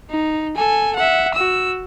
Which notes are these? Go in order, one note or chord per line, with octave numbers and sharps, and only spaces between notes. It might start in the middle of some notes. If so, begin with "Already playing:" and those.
D#4
A4 G#5
E5 F#5
F#4 E6